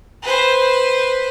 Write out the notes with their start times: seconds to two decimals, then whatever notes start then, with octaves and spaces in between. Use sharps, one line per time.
0.22 B4 C5